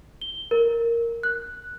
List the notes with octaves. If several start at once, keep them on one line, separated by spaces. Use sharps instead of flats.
G7
A#4
F#6